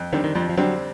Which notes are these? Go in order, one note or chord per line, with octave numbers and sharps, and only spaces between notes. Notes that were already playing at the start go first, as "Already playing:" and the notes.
Already playing: F2
D3 D#3 G3 C4
D#3
F2 F3
F3
D3 F#3 G3 C4